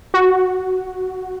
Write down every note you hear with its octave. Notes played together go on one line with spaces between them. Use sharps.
F#4